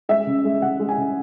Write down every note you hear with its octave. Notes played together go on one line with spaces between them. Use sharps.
G#3 E5
C#3
G#3
C#3 F#5
G#3
G#5
C#3